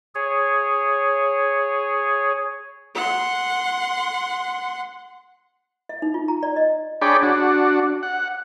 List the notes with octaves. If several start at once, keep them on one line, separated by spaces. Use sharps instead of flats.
G#4 C#5
F#5 C6
E5
D#4
F4
A#5
D5
D#5
D4 G#4 C#5 D5 G5 B5
D4 F#4
F#5